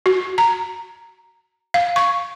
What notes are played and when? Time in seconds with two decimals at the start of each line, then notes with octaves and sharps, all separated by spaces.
0.06 F#4
0.38 A#5
1.74 F5
1.96 C#6